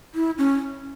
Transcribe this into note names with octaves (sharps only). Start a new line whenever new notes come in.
E4
C#4